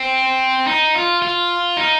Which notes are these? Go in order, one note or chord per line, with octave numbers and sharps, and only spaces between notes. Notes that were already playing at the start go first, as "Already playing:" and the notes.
Already playing: C4
D#4
F4
F4
D#4